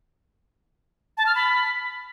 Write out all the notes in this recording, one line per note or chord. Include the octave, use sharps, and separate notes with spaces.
A5
F6
B5